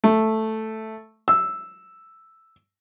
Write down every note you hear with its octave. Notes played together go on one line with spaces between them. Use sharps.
A3
E6